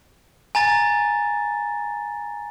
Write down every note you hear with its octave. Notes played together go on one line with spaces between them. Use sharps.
G#5 A#5 A6